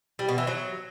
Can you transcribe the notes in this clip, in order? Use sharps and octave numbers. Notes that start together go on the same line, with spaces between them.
G3
B2
E3
F#3